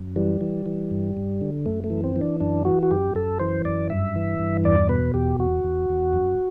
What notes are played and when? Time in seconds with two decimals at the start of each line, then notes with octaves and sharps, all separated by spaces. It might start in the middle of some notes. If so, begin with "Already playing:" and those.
Already playing: F#2
0.16 E3 G3
0.41 E3
0.66 E3
0.91 G2
1.17 G2
1.41 D3
1.66 F#2 A3
1.84 A3
1.90 E3
2.04 C4
2.16 E3
2.21 D4
2.40 F#2 D4
2.65 E3 F#4
2.83 F#4
2.91 F#2 G4
3.15 F#2 A4
3.40 E3 C5
3.65 F#2 D5
3.90 G2 E5
4.15 E3
4.39 G2
4.64 E2 D5
4.89 B2 B4
5.14 E2 G4
5.39 E2 F#4
5.64 E2
5.90 E2
6.13 F#2